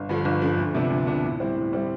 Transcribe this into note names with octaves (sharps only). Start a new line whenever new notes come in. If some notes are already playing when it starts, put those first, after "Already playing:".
Already playing: G1
G2 D3 F3
G1
G2 D3 F3
D2
C3 F3 B3 D4
D2
C3 F3 B3 D4
A2
G3 C4 E4
A2
G3 C4 E4